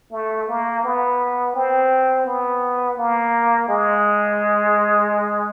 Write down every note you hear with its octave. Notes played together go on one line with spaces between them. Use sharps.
A3
A#3
B3
C4
B3
A#3
G#3